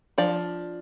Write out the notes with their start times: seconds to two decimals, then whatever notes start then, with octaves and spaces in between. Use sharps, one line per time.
0.18 F3 D4 D5